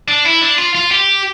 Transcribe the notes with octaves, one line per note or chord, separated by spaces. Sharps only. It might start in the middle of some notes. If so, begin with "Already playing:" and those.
D4
E4
D4
F4
F4
G4